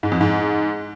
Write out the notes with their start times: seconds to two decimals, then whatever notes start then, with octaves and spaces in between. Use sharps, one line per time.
0.03 G#2
0.12 F2
0.21 G#2